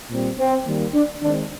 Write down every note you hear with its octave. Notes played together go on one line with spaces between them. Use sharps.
A#2 G3 C4
C4
D#3 G3 A#3
D4
D#3 G#3 C4 D4